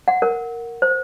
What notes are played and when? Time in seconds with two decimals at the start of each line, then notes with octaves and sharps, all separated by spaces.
0.08 F#5
0.22 A#4
0.82 C5